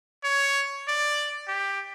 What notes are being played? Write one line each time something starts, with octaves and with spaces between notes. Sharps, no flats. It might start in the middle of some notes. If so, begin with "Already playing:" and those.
C#5
D5
G4